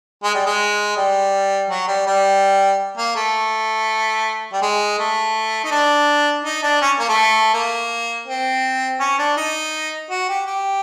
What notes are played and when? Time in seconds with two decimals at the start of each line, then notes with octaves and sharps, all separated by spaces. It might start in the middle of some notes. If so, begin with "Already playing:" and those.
0.24 G#3
0.35 G3
0.46 G#3
0.97 G3
1.70 F#3
1.88 G3
2.07 G3
2.97 A#3
3.16 A3
4.53 G3
4.62 G#3
4.99 A3
5.64 D#4
5.71 D4
6.45 D#4
6.63 D4
6.82 C#4
6.99 A#3
7.09 A3
7.54 A#3
8.27 C4
9.00 C#4
9.18 D4
9.37 D#4
10.10 F#4
10.29 G4
10.47 G4